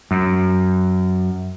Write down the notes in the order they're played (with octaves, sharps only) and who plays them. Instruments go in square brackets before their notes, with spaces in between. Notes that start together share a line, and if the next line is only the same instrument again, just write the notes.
[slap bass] F#2